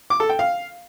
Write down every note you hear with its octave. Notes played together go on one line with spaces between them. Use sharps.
D6
A4
G5
F5